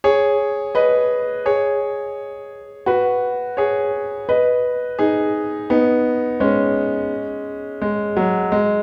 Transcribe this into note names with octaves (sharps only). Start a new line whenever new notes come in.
G#4 C#5
B4 D#5
G#4 C#5
F#4 B4
G#4 C#5
B4 D#5
D#4 G#4
B3 D#4
G#3 C#4
G#3
F#3
G#3